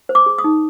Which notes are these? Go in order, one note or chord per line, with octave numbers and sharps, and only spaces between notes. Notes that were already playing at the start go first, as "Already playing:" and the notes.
C5
D6
G#4
D#6
D#4